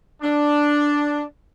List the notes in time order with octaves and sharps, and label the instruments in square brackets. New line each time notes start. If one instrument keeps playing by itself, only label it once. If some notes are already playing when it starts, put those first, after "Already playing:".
[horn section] D4